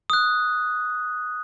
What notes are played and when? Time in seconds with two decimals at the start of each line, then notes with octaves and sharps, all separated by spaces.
0.10 D#6 F#6